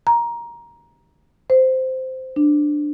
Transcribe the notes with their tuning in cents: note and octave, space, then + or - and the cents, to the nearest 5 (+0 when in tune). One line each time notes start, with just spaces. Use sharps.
A#5 +15
C5 -10
D4 +10